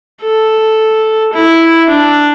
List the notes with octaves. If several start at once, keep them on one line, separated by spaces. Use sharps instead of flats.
A4
E4
D4